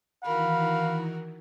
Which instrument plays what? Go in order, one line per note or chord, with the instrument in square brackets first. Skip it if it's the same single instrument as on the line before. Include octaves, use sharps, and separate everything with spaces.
[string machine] D#3 E3 [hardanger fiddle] F#4 A#4 [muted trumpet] F5 [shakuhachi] B5